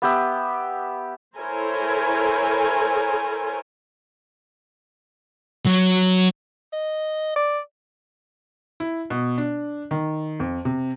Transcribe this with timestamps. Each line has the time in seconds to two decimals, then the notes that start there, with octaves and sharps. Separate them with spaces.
0.02 B3 G4 E5
1.37 E4 A4 A#4 C5 C#5 G#5
5.65 F#3
6.73 D#5
7.36 D5
8.80 E4
9.10 B2
9.38 D4
9.91 D#3
10.40 F2
10.65 C3